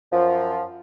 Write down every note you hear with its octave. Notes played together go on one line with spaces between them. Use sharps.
F#2 F3